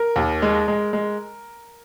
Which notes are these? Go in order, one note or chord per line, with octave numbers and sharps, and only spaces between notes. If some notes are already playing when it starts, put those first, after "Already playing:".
Already playing: A#4
D#2
G#3
G#3
G#3